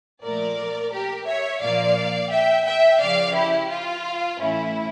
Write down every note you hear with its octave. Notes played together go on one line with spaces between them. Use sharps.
A#2 F3 A3 A#4 D5
G4 A#4
C#5 E5
A#2 F3 A#3 D5 F5
E5 G5
E5 G5
C#3 F3 C#4 D5 F5
E4 G4
F4
A2 E3 A3 C#4 E4